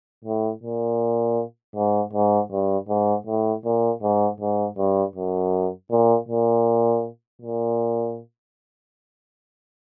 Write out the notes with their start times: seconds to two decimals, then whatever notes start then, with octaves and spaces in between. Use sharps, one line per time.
0.25 A2
0.63 A#2
1.75 G#2
2.13 G#2
2.51 G2
2.88 G#2
3.26 A2
3.65 A#2
4.02 G#2
4.40 G#2
4.77 G2
5.16 F#2
5.91 A#2
6.28 A#2
7.42 A#2